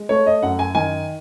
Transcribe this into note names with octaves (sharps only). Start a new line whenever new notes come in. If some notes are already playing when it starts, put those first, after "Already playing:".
Already playing: G#3
A3 C#5
D#5
F#2 F#5
G#5
D#3 G#5